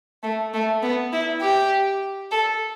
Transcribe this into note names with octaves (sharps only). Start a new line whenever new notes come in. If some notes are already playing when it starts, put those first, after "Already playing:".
A3
A3
B3
E4
G4
A4